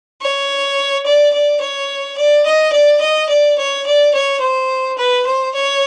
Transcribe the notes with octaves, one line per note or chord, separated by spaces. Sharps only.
C#5
D5
D5
C#5
D5
D#5
D5
D#5
D5
C#5
D5
C#5
C5
B4
C5
C#5